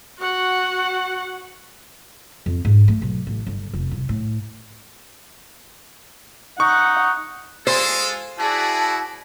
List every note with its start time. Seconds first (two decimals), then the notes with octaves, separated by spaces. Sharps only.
0.19 F#4 F#5
2.46 F2
2.65 G#2
2.88 A3
3.02 B1
3.27 A1
3.46 G1
3.73 F1
3.91 C2
4.09 A2
6.60 D#4 F#5 C#6
7.67 G#3 F4 G#4 A4 C5 G#5
8.39 E4 F#4 G#4 D5 A5